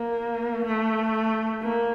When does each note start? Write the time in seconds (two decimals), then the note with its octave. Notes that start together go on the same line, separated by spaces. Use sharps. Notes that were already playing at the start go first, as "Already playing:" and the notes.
Already playing: A#3
0.66 A3
1.62 A#3